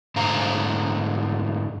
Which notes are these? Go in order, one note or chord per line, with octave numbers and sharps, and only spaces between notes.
G#2 D3 A3 C5 F5 A#5